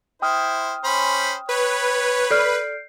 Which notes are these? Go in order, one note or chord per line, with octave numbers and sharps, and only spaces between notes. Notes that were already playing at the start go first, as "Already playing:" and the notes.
E4 C5 G5 D#6 F6
C#4 C5 B5
B4 C#5
A4 D5 F6 G6 C7 D7